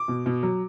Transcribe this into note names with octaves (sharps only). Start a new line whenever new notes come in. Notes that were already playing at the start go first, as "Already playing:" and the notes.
Already playing: D6
B2
B2
F#3